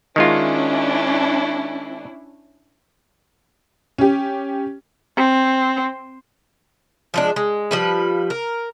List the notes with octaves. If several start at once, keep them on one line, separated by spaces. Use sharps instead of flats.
D#3 G#3 C#4 D4 E4 F4
C#4 G4
C4
F3 G#3 D4
G#3
F3 G3 B4
A#4